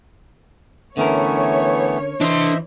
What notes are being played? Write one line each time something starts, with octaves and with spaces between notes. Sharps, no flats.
D3 E3 A3 B3 C#4 A#4 C#5
E3 D4 C5 D#5 E5 C6